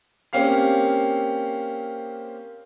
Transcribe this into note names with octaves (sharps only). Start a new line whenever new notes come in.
A#3 C4 C#4 G4 F5 C7